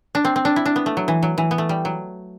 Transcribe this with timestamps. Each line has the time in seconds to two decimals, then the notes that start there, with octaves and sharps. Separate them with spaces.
0.15 D4
0.25 C4
0.36 C4
0.45 D4
0.56 E4
0.66 D4
0.76 B3
0.86 A3
0.97 F#3
1.08 E3
1.23 F#3
1.38 E3
1.51 B3
1.58 A3
1.69 G3
1.85 F#3